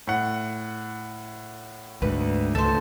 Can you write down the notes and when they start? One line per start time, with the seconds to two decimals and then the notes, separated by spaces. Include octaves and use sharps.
0.07 A2 F#5
2.02 D2 G#2 G#3 B4
2.55 C#2 A3 A4 C5